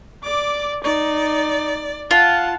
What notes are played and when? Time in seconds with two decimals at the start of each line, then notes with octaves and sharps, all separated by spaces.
0.24 D5 D6
0.84 D#4 D5
2.11 F4 F#5 A5